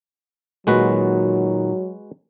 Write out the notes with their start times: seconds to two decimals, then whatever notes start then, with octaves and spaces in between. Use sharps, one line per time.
0.67 A#2 D#3 F#3 G#3 F#4 B4